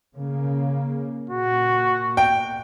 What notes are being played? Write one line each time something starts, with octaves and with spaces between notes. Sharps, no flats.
C#3 A#3
A#2 F#4
G5